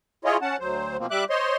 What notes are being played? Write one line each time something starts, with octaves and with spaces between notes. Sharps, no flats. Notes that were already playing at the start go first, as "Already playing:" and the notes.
E4 F4 G#4 C#5 D#5
C#4 F#5 A5
D2 F#3 C5
B2 F3 A#3 C4
G3 E5 D6 F#6
C5 C#5 D#5 C6